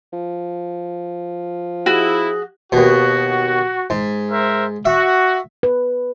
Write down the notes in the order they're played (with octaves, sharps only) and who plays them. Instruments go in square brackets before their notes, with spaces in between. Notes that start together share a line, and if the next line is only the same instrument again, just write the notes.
[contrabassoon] F3
[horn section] E4 [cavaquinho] F#4 [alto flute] G#4
[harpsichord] D#2 B2 [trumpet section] F#4
[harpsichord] G#2
[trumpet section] A#4 C5 E5
[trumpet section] F#4 [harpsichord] E5
[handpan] B4